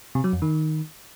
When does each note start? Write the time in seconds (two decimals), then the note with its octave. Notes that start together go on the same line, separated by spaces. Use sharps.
0.15 C3
0.24 F#3
0.33 F2
0.42 D#3